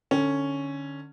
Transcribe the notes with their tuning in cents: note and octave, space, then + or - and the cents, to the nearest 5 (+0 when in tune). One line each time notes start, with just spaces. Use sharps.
D3 +20 C#4 +0